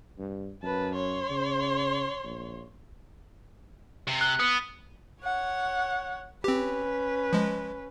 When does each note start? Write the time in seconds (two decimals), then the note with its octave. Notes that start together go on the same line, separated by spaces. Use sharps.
0.18 G2
0.63 F#2 B4 A5
0.95 C#5 C6
1.30 C#3
2.24 A#1
4.08 C3
4.21 F#6
4.39 B3 D#6
5.22 C#5 F#5
6.44 C4 C#4 G4 B4
7.33 F3 G#3